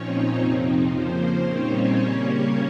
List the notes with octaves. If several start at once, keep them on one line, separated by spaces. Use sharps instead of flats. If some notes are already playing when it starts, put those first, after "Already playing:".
Already playing: A#2 F3 C4 C#4 D#4 C#5
F2 C3 F3 C4 D#4
C#3 F3 A#3 C5
A#2 G3 C4 C#4 D#4 C#5
C#3 G3 A#3